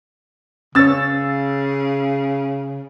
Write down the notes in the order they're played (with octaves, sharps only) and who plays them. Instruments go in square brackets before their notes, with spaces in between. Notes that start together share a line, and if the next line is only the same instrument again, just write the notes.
[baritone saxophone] C#3 [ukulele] C#4 C#5 [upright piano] E6 A6